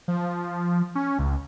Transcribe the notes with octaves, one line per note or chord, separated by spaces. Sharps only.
F3
C#4
C#2